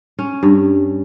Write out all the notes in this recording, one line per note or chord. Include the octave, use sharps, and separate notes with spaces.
C#4
G2